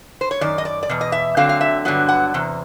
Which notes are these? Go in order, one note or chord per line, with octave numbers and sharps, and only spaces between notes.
C5
C#5
F#2 D#3 D5
D#5
D5
D5
E2 B2
D#5
E5
D3 F#3 A3 C4 F5
F5
E5
G2 D3 F#3 B3
F#5
E2 C3